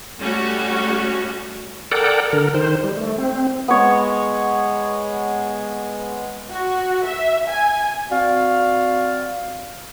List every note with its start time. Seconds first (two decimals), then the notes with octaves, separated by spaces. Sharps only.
0.19 G3 A3 C#4 F#4
1.92 A4 A#4 D5 F#5 G5
2.33 D3 A#4
2.54 D#3 C5
2.84 G3
2.97 A3
3.18 C4
3.68 G#3 B3 C#5
6.50 F#4
7.05 E5
7.48 G#5
8.12 C4 F#4 D5 F5